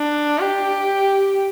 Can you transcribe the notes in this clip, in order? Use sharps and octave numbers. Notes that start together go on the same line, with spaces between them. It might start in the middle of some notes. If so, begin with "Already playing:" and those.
Already playing: D4
G4